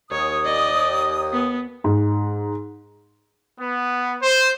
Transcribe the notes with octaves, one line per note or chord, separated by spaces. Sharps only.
D#2 C#5 D#6
D5 D#5
B3
G#2
B3
C5